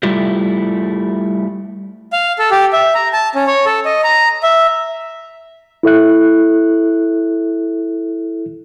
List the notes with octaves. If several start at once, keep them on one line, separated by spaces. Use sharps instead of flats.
G3 A3 E4 F4 G4
F5
A4
G4
E5
A#5
A5
C#4
C#5
A4
D#5
A#5
E5
E4 A4 E5 F#6